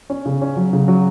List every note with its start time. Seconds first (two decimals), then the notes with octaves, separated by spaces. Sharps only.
0.10 C#4
0.26 C#3
0.42 C#4
0.56 F#3
0.73 C#3
0.88 F#3